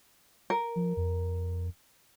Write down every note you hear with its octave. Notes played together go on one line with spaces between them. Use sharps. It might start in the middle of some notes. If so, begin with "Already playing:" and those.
A#4
F3
F2